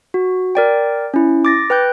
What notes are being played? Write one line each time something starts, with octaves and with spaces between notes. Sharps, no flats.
F#4
A#4 D5 G5
C#4 E4
D6 A6 A#6
B4 G5 F#6 G6